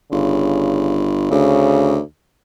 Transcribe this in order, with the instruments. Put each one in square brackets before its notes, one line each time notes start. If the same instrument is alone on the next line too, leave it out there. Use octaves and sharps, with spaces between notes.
[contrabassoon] G1 [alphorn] C#3
[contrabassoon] D2 [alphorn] C#3